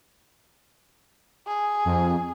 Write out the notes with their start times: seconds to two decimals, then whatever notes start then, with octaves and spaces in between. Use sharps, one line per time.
1.47 G#4
1.85 F2